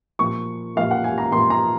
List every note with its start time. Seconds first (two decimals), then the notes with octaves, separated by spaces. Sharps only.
0.19 A#2 F3 A#3 C#6
0.75 A#2 F3 A#3 F5
0.91 F#5
1.04 G#5
1.18 A#5
1.32 A#2 F3 A#3 C6
1.50 A#5